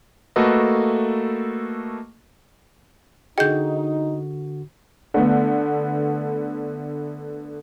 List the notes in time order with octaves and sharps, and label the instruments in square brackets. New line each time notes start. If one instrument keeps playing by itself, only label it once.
[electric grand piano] A3 A#3 F#4 A4 B4 D#5
[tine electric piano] D3 F#4 [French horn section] D#4 [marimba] G#4 D#5 [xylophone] G5 G6
[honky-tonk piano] D3 A3 B3